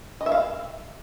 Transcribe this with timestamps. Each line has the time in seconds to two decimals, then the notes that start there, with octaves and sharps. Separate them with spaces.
0.21 D#5
0.26 E5
0.32 F5